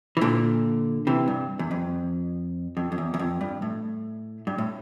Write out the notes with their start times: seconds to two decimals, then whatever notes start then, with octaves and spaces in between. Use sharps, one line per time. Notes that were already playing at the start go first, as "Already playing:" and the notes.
0.17 E3
0.21 A#2 D3
1.07 C3 E3
1.28 G2
1.59 E2
1.71 F2
2.77 F2
2.92 F2
2.98 E2
3.14 E2
3.19 F2
3.41 G2
3.62 A2
4.47 G2
4.58 A2